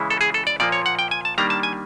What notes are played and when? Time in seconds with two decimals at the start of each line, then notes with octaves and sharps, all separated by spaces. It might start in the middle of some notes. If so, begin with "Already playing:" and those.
Already playing: C#3 E3 G#3 C#4 E4
0.10 A4
0.21 G#4
0.34 A4
0.47 D5
0.60 A#2 F3 A#3 D5
0.72 C#5
0.86 F#5
0.99 G5
1.11 G#5
1.25 A5
1.38 D#3 G3 A#3 D4 A#5
1.50 A5
1.63 G#5